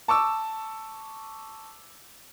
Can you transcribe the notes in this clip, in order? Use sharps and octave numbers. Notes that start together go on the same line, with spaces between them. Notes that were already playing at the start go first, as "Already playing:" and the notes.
A5 C#6 D6 E6